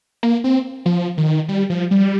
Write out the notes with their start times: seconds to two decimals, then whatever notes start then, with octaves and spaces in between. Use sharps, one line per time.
0.23 A#3
0.44 C4
0.86 F3
1.18 D#3
1.49 G3
1.70 F3
1.91 G3